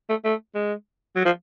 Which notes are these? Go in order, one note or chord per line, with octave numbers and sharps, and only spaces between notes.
A3
A3
G#3
F#3
F3